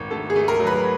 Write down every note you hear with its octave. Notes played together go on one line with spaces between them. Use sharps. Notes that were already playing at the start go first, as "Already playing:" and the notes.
Already playing: G#1
A3 A4
G#4
A3
A#4
F#3
B4